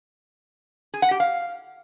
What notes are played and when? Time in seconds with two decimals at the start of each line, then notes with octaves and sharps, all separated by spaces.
0.94 G#4
1.02 F#5
1.11 G4
1.20 F5